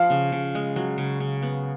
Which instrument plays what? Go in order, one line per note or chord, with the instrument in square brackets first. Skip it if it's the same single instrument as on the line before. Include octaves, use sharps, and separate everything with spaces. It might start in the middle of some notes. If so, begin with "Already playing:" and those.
Already playing: [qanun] F3 [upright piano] F5
[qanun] C#3
C#3
G#3
F#3
C#3
C#3
B3